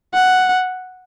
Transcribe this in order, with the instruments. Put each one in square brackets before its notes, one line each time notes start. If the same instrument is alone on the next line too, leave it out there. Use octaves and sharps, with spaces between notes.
[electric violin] F#5